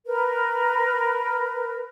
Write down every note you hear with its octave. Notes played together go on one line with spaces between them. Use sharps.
A#4 B4